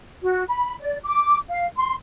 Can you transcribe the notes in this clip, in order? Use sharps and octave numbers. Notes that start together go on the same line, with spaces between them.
F#4
B5
D5
D6
F5
C6